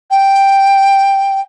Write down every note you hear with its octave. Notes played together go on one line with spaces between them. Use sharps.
G5